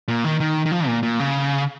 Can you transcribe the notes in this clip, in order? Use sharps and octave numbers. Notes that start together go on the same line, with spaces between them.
A#2
D#3
D#3
D#3
F3
A#2
A#2
C#3